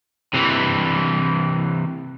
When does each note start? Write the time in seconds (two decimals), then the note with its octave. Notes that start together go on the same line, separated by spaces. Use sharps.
0.34 C3 E3